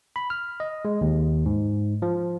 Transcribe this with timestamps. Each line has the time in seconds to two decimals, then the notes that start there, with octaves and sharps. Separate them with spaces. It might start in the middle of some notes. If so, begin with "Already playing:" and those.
0.16 B5
0.30 F6
0.60 D#5
0.85 G#3
1.01 D#2
1.46 G#2
2.02 F3